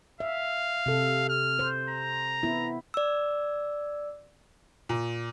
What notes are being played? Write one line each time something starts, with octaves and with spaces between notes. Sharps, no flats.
E5 F5
C3 A4
F6
C5
A#5
B3 E4
D5 E6
A#2